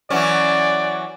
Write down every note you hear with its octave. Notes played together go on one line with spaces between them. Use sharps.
E3 F#3 C#4 D5